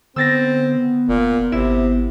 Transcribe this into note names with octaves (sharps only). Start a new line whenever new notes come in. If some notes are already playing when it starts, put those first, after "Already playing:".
D3 B3 C4 E6 A6 A#6
F1 A#2
G#1 C3 E4 E7